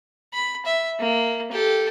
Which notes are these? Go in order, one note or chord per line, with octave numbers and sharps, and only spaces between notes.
B5
E5
A#3
G4 A4